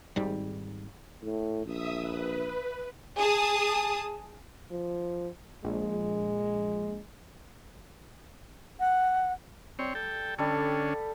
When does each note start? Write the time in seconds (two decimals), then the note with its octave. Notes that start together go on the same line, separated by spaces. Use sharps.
0.16 G#1 G#2 G3
1.23 A2
1.66 A#1 E5 D#6
2.01 B4
3.19 G#4 A5 D#6
4.71 F3
5.64 A#1 G#3
8.80 F#5
9.79 G3 C4 C#5
9.95 A4 G5
10.38 D3 G3 C#4 A4